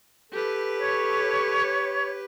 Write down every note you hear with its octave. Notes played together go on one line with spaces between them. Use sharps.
G4 A4 B4
C#5